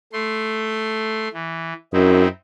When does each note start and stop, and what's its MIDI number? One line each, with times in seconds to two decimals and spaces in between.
0.13 1.28 57
0.13 1.28 84
1.33 1.73 52
1.93 2.24 42
1.93 2.28 60
1.93 2.28 63
1.93 2.28 64